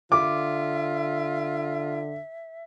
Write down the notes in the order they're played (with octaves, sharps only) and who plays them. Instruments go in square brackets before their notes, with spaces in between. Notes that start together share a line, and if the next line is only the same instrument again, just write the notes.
[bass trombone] D3 [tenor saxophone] F4 [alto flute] E5 [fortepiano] D6